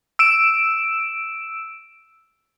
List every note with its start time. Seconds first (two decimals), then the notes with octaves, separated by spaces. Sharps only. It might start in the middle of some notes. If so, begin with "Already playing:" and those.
0.19 E6 D7 E7